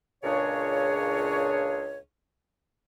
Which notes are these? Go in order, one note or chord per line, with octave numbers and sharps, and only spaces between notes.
C#2 A#2 C#3 D4 G#4 C#5